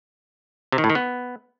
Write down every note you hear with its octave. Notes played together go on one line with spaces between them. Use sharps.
C3
D#3
A2
D#3
B3